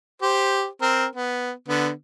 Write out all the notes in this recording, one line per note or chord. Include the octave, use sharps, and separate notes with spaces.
G4 C5
C4 A#4
B3
D3 B3